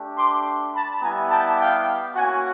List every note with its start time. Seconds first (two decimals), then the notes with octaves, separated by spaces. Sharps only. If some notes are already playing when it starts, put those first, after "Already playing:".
Already playing: A3 D4 G4
0.16 C6 D6
0.73 A5 B5
1.02 G3 B3 E4 G4 G#5 A#5
1.31 G5 A5
1.59 F5 G5
2.16 A#3 C#4 F#4 F#5 G#5